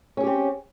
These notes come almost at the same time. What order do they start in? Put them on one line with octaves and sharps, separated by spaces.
C#4 G#4 G4 C4